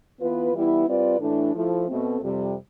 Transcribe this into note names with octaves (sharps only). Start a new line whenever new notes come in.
E3 B3 F4 B4
E3 G3 B3 E4
G3 C4 F4 B4 D5
A2 E3 A3 D4
F3 A3 E4
B2 A3 C4
F2 C3 G3